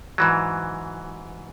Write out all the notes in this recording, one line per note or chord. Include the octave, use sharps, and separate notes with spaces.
G#2 E3 F#3